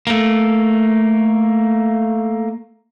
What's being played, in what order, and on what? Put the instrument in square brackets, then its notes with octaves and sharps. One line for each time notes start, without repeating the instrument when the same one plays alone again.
[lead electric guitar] A3 A#3